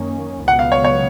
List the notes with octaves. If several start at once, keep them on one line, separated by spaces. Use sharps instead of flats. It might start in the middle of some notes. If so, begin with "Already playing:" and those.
Already playing: F#2 D#3 A#3 C#4
C#2 B2 F#3 B3 F#5
F5
C#5
C#5